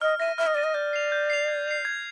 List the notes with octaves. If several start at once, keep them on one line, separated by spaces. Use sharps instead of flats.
D#5 F6
E5 A#6 D#7
E5 F6
D#5
D5 A#6 D#7
D#5
D5 G6
C7 F7
G6
C7 F7
G#6
C7 F7
G#6